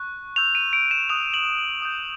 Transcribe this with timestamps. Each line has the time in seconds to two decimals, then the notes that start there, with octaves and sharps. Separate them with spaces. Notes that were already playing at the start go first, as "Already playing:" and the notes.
Already playing: C#6 F#6
0.36 C#6 E6 G6 F7
0.55 D#7
0.73 D7
0.91 E7
1.09 D#6 F#6 F7
1.34 F#7
1.82 D#6 G6